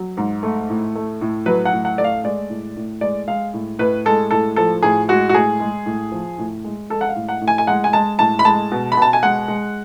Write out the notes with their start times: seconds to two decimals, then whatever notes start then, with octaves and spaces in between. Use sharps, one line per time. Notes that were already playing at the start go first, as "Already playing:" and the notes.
Already playing: F#3
0.17 G#2
0.43 A3
0.70 A2
0.95 A3
1.21 A2
1.46 F#3 B4
1.65 F#5
1.73 A2
1.85 F#5
1.98 A3 D5
2.04 F5
2.24 G#3 D5
2.50 A2
2.76 A2
3.01 G#3 D5
3.28 G#3 F5
3.54 A2
3.79 A2 B4
4.06 G#3 A4
4.31 A2 A4
4.56 F3 A4
4.82 A2 G#4
5.09 G#3 F#4
5.29 F#4
5.34 A2 G#4
5.60 G#3
5.86 A2
6.12 F3
6.38 A2
6.64 G#3
6.90 G#3 A4
7.01 F#5
7.09 F5
7.16 A2
7.29 F#5
7.41 A2
7.48 G#5
7.58 G#5
7.67 G#3 F#5
7.84 G#5
7.93 G#3 A5
8.19 A2 A5
8.39 B5
8.45 G#3 A5
8.71 B2
8.92 B5
8.97 B2 A5
9.13 G#5
9.23 G#3 F#5
9.48 G#3